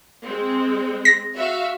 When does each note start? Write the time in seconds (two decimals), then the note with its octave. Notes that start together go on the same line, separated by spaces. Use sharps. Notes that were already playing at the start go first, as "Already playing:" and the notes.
0.25 G#3 C4
1.05 A#6
1.36 F#4 E5 F5